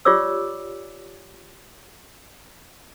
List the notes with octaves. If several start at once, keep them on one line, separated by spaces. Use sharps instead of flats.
F4 G4 C#5 D5 D6 E6